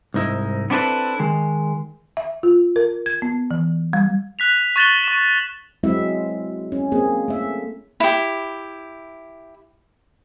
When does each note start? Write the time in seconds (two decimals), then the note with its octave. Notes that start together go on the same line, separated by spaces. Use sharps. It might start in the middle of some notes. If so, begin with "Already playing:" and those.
0.14 C2 G#2 D#4 E4
0.70 B3 C4 D4 E4 A4 B4
1.20 D#3 G#3
2.17 E5
2.43 F4
2.76 A#4
3.06 G#6
3.22 B3
3.51 E3
3.93 G3
4.39 F#6 B6 F7
4.76 C#6 F#6 A6 E7 F#7 G7
5.04 C#6 E7
5.83 F#3 G#3 C4 E4 E5
6.72 C#4
6.92 A#3 C4 G#4
7.28 A3 E5
8.00 E4 G4